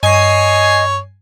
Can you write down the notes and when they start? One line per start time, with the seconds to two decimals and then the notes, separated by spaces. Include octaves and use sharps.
0.03 G2 C#5 D#5 G#5 C7